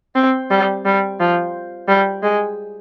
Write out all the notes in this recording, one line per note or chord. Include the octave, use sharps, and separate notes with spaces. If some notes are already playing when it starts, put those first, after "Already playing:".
C4
G3
G3
F3
G3
G#3